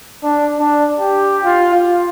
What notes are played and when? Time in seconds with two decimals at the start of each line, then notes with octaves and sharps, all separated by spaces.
0.23 D4
0.59 D4
0.98 G4
1.44 F4
1.74 F4